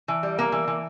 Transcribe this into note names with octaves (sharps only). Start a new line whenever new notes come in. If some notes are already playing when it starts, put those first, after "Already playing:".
E3
G3
A#3
E3
E3